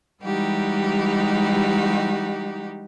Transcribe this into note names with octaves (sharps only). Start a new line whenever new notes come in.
E3 G3 G#3 D#4 F#4 G4